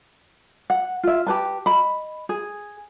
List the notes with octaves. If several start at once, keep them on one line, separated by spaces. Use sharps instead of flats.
F#5
F4 E5
G4 B4 A5
D#5 B5
G#4